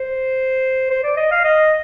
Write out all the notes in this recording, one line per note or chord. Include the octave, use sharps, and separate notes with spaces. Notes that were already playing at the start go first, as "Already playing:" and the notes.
Already playing: C5
C5
D5
D#5
F5
D#5